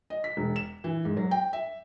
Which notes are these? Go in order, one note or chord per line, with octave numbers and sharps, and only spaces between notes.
D#5
B6
E1
E7
E3
G#2
F#3
G5
E5